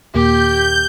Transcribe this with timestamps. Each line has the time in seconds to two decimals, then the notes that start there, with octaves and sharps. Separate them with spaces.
0.14 D#2 A#2 A#3 G4 G6